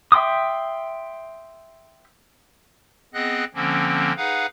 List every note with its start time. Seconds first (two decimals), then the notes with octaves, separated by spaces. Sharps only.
0.12 E5 G5 C6 D6 D#6
3.14 B3 C4 G#4 D#5 F#5 F#6
3.54 D3 F3 A#3 C4 C#4
4.17 D#4 G#4 B4 F5 F#5